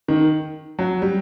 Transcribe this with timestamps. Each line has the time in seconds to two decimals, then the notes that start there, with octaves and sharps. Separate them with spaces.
0.08 D#3
0.79 F#3
1.02 G3